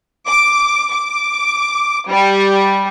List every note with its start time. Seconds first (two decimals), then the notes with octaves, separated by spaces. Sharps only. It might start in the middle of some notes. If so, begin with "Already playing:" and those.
0.28 D6
0.91 D6
2.09 G3